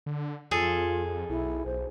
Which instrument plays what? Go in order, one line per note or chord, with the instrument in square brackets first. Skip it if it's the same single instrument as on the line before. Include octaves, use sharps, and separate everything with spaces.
[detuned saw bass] D3
[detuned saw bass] F2 [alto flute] F4 [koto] G#4 A4
[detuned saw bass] B1 [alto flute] E4
[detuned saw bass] B1 [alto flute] C5